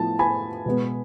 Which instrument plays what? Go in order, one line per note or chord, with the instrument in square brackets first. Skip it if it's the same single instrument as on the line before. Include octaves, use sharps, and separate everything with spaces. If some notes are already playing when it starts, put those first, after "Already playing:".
Already playing: [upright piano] A2 F3 B3 A5
G#5 B5
B2 G#3 B3